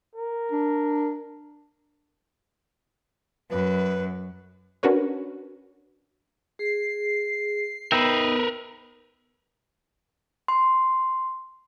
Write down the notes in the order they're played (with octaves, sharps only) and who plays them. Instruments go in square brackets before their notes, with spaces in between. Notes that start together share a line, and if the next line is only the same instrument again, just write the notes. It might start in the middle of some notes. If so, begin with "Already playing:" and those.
[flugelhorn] A#4
[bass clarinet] D4
[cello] F#2 [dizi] B4
[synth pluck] C#4 D4 F#4 A#4 B4 C#5
[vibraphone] G#4 [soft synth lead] C7
[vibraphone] B3 [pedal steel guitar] D#4 E5 G5 [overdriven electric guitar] A#4 B4
[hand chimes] C6